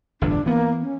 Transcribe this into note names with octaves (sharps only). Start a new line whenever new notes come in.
G1 E2 A2 D4
E3 A#3 B3
C#4